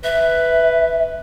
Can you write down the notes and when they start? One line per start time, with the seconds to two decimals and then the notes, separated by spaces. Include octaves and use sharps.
0.04 B4 E5